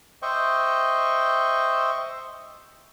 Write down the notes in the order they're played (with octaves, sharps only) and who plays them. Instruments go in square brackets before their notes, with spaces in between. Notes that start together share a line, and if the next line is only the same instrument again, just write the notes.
[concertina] C5 D#5 E5 G5 C#6